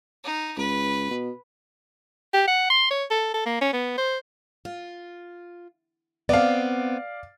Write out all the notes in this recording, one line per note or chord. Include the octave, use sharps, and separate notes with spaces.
D#4
C#2 B4
B2
G4
F#5
C6
C#5
A4
A4
A#3
C#4
B3
C5
F4
B3 C4 D5 F5